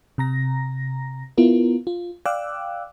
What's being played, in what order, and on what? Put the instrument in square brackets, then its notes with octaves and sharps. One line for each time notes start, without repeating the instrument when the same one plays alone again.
[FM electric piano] C3 A#5 A#6
B3 E4 F4 A#4
F4
D5 F5 G5 D6 E6 F#6